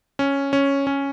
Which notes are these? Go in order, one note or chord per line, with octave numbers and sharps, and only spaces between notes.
C#4
C#4
C#4